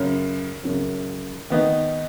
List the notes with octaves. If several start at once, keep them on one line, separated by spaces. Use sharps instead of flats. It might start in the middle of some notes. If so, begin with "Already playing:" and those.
Already playing: F#2 C#3 F#3
F#2 C#3 F#3
D#3 B3 D#4